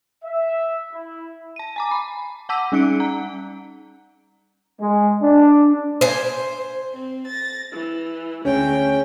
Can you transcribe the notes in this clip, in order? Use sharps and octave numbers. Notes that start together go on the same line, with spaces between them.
E5
E4
A5 D#7
G#5 A#5 D6
B5
F#5 A5 D6 E6 B6 D#7
G3 C#4 D#4 F#6 C#7 D7
F#5 A#5
G#3
D4
C5 G#5
C4
A6 A#6
E3
D2 C#3 C#4 G5